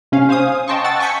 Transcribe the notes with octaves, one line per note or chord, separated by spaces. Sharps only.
C3 C#4 F5
C5 F5 G#5 D#6
D#5 G5 A5 C6 C#6
F#5 A5 E6 A6
G#5 C#6 G6 B6 C#7